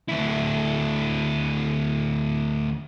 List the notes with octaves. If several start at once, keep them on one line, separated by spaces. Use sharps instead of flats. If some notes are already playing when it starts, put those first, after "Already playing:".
D2 E4